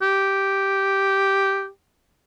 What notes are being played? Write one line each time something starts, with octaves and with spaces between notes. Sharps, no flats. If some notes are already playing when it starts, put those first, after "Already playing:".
G4